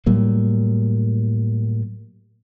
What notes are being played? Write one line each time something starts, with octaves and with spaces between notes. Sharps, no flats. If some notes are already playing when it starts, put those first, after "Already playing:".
A2 F#3 G3 A#3